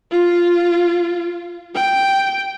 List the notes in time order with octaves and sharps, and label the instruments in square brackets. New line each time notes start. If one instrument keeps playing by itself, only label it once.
[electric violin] F4
G5